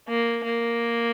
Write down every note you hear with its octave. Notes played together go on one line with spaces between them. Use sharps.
A#3
A#3